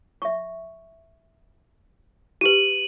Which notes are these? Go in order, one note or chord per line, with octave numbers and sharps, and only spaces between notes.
E5 C#6
F#4 G4 B4 D#7 F#7